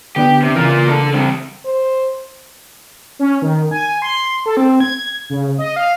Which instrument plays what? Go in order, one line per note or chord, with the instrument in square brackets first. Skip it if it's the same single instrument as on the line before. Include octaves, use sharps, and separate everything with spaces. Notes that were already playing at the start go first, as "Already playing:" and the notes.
[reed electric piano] D3 B3 D4 [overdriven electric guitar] G4
[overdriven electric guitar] C3
[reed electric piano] C#3 E3 [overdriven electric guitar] A#3 F4
[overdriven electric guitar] D4 A4
G3 C4
[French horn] C5
[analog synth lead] C#4
D#3
G#5
C6
A4
C4
G#6
C#3
D#5
F5